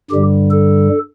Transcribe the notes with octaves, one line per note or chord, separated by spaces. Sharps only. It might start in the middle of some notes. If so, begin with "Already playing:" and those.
G2 D3 G3 G4
A4